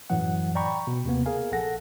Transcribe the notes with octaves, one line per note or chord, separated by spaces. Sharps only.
F#2 A2 E3 F#3 F#5
D5 G5 A#5 B5 C#6
B2
D#2 C3 A#3 B3
G#4 A#4 F5 G#5
A#1 A4 F#5 A#6